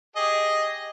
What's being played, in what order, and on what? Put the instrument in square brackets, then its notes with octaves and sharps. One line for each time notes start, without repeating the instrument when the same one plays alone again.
[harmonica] G4 G#4 D#5